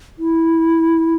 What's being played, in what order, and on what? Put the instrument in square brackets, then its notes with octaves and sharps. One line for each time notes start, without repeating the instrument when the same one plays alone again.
[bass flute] E4